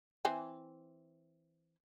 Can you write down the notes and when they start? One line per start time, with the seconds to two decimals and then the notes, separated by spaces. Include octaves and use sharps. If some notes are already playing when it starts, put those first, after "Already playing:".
0.25 E3 C4 G#5